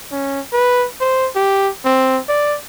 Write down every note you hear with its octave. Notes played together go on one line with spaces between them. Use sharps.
C#4
B4
C5
G4
C4
D5